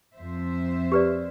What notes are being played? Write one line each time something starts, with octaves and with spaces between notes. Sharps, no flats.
F2 C5 E5
G4 B4 D5